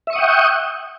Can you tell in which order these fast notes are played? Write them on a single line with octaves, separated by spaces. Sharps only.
E5 C#6 D#6 F#5 G5